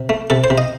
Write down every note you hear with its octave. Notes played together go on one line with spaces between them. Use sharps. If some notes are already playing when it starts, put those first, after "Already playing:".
Already playing: C3
A3
C3 A4
C5
C3
D#5